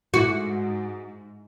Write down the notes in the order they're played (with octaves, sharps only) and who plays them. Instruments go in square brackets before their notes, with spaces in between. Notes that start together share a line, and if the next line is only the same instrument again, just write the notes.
[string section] G#2 [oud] F#4